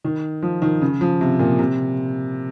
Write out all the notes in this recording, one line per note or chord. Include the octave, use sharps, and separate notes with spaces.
D#3
F3
D#3
C#3
F3
C3
A#2
C3